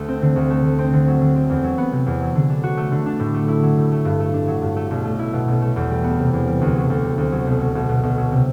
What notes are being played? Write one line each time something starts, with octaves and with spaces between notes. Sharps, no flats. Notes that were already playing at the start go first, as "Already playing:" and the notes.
Already playing: D2 A3
C4
D3
D2
A3
D3
C4
D3
F#3
D3
C4
E2
F#3
B3
C3
E2
F#3
D3
D4
F#4
A3
D3
D4
A2
A3
E4
F#3
A2
A3
G2
A3
D4
F#3
G2
A3
B1
A3
E4
B2
B1
A3
E2
G3
B3
C3
E2
G3
D2
F#3
D2
C3
D2
F#3
B1
F#3
B1
B2
B1
F#3
C3